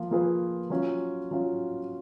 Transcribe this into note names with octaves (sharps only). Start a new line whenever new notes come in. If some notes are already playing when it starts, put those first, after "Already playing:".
Already playing: F3 A#3 F4
F3 A#3 F4 G#4 B4
F#3 C#4 F4
F#3 C#4 F4